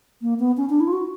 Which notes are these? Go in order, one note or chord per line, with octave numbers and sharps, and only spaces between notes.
A#3
B3
C#4
D4
E4
F4
F#4